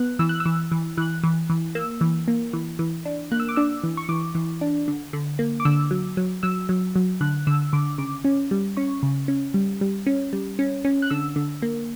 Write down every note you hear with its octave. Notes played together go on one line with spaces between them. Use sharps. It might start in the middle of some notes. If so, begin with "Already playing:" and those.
Already playing: B3 F#6
E3 E6
F#6
E6
E3
E3
E3 F#6
E3
E3
A#3 E6
E3
A#3
E3
E3
D4
A#3 F#6
E6
D6
D4 E6
E3
C#6
E3 D6
E3
D4
D3
D3
A#3
D6
D3 E6
F#3
F#3
F#3 E6
F#3
F#3
D3 F#6
D3 E6
D3 D6
C#3 D6
C#4
G3
C#4 C#6
C#3
C#4
G3
G3
C#4
G3
C#4
C#4
F#6
D3 E6
D3
A#3